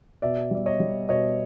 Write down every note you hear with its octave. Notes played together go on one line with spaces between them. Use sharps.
B2 D5 E5
G3 D5
C#5 D#5
G3
B2 C#5 D#5